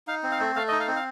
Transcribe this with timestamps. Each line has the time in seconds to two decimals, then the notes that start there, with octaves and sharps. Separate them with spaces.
0.07 D#4 F5
0.23 C4
0.31 F5
0.40 A3
0.56 A3 F5
0.68 D#4 D#5
0.80 F5
0.88 C4
0.96 F5